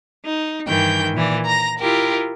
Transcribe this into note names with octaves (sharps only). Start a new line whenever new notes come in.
D#4
G2 D#3 E3 G5 G6
A#2 E3 D5
A#5 A#6
E4 F4 G4 A#4